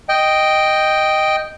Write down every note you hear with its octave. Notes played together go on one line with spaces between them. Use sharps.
D#5 G5